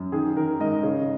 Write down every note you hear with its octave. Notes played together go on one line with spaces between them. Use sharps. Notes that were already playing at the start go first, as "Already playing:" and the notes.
Already playing: F#2
D#3 G#4
D#3 A#4
G#2 D#5
C#3